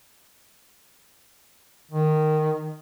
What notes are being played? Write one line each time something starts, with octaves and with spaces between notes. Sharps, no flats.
D#3